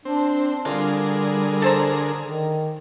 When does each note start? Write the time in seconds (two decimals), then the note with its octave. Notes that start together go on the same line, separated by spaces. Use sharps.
0.05 C4 D4
0.65 D3 G3 F4 G#4 A#4
1.62 A4 C5 A#5
2.23 D#3